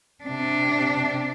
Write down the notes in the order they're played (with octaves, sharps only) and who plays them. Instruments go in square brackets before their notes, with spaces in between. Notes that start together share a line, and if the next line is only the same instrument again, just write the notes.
[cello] C3 D4